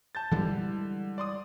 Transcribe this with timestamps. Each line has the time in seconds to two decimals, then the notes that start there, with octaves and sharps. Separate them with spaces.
0.15 A5 G6 A6
0.31 D3 E3 G3 G#3
1.18 D5 C6 D#6